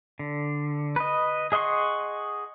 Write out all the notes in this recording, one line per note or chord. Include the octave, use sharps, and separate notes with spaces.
D3
B4 D#5
G#4 D#5 F#5 C6 C#6